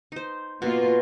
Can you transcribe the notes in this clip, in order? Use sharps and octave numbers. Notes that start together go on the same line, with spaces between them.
D#4 C5
B2 A#3 B3 F4